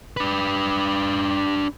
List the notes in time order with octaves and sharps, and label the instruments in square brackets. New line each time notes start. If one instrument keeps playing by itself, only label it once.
[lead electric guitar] D4 B4